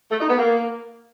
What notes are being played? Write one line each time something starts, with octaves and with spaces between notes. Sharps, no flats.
A3
D#4
B3
A#3